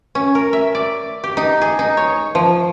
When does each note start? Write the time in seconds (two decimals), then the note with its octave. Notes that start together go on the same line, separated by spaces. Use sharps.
0.15 C#4
0.35 A#4
0.53 E5
0.75 D5
1.24 G4
1.37 D#4
1.61 G#4
1.79 D#4
1.97 C#5
2.35 F3